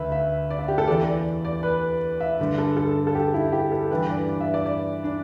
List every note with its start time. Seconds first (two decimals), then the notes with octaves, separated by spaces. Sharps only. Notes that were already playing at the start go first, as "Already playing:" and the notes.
Already playing: D2 D3 B4 E5
0.12 E5
0.50 D5
0.59 E5
0.68 G4
0.78 A4
0.88 E2 E3 D5
1.07 D5
1.45 D5
1.63 B4
2.20 E5
2.40 G2 D3
2.58 A4
2.77 A4
3.07 A4
3.15 G4
3.34 E4
3.52 G4
3.72 A4
3.91 G2 E3 B4
4.09 D5
4.29 D5
4.41 E5
4.54 D5
4.66 D5
5.04 D4